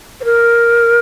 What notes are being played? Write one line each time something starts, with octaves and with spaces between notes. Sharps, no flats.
C5
A#4